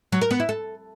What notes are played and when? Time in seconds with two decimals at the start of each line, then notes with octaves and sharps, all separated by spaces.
0.12 F#3
0.21 A#4
0.31 B3
0.40 E4
0.49 A4